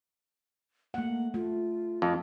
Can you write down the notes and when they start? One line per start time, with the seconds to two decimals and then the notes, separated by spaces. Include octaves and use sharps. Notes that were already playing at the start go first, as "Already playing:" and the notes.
0.94 A3 A#3 F#5
1.34 A3 F4
2.02 F2